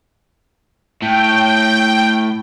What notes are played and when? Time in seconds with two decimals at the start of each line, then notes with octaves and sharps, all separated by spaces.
1.02 A2 G5